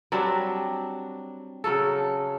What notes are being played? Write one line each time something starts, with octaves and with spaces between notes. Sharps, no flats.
F#3 G3 C4 D4
C#3 F#3 C#4 A4